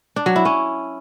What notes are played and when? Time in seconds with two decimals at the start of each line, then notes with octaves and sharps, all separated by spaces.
0.16 D4
0.26 F#3
0.36 E4
0.45 C#4